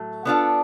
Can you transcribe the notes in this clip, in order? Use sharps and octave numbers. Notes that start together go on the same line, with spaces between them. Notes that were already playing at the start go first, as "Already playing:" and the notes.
Already playing: A2 F#3 A3
B3 D4 F4 A4